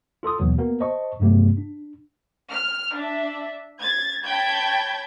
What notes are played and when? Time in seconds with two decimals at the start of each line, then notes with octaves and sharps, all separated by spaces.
0.23 F4 A4 C6 D#6
0.39 D#2 B2 E3 F#3 B3
0.58 A#3 B3 F#4 A#4
0.80 C5 D#5 A5 C#6
1.20 G2 C3 F#3 A3 B3 G4
1.57 D4
2.50 F6
2.94 D4 E5
3.79 G#6 A6
4.24 C#5 G5 A5 B5 G6 G#6